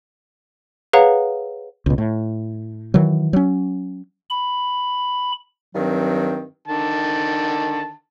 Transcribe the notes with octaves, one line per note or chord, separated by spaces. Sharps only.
G#4 B4 C#5 F5 F#5 A#5
C#2 B2
A2
D#3 E3 F#3
F#3 C#4
B5
G2 D#3 F#3 C4
D3 D#3 A5